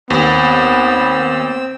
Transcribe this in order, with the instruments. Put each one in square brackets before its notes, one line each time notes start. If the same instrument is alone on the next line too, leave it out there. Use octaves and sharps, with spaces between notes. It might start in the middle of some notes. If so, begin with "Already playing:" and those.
[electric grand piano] D#2 [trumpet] B3 [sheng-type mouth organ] C4 E6